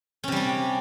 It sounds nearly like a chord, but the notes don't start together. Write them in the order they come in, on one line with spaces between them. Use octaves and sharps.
C#4 C3 G3 D4